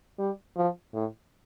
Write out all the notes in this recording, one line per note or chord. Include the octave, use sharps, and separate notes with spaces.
G3
F3
A2